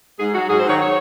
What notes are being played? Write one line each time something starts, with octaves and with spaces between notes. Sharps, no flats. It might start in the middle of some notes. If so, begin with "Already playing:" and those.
G#2 G#4
F#3 F#4
G#2 G#4
C5
D#3 F#3 C#5
C#5